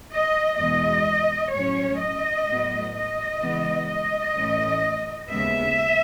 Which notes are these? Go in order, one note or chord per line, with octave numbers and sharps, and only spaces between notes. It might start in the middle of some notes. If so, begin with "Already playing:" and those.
D#5
E2 B2 G#3 D#5
A2 F#3 C#4 C#5
D#5
A2 F#3 B3
D#5
C#3 E3 G#3 B3
D#5
A2 E3 A3 C#4
D#2 C#3 G#3 B3 E5